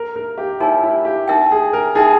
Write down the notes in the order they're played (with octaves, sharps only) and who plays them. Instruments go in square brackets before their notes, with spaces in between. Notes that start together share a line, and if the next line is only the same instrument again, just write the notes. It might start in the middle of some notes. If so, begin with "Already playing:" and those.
Already playing: [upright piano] A#4
A#4
G4
[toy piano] D#4 A#4 C#5 G#5 [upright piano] E4
[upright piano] E4
G4
[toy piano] D#4 A#4 E5 G5
[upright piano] G#4
A#4
[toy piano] D#4 A#4 E5 G5 [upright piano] G#4